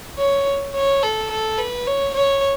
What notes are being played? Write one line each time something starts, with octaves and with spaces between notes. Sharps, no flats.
C#5
C#5
A4
A4
B4
C#5
C#5